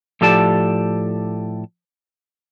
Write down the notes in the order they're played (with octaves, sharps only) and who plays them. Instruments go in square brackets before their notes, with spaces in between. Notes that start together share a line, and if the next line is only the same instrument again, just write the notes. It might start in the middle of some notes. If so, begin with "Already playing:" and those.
[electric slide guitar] A2 F3 G4 A4 D5 A5